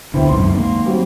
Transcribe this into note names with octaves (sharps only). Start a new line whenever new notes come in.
D2 B2 D3 E4 C5 G5
G#1 C#2 F#2 C6
A3 A#3
F#3 G3 C4